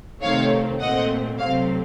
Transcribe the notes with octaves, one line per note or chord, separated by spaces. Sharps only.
C3 D#3 A3 C4 C#5 F5
A#2 A3 C4 D#5 F#5
C3 F#3 A3 C4 C#5 F5